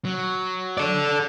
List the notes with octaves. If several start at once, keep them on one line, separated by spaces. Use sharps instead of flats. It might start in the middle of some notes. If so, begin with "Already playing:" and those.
F#3
A4 D5